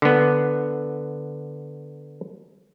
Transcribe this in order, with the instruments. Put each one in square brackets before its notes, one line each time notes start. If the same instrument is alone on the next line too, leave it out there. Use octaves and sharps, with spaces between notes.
[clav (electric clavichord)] D3 B3